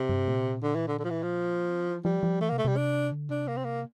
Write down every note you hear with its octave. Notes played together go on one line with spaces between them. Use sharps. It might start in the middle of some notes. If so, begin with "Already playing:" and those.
Already playing: C3
G2
A#2
D3
E3
D3
D3
F3
E3
F3
C3
E3
F3 G3
F3
E3 A3
C3 A#3
A3
C3 G3
D4
D3
C3 D4
A#3
C4
A#3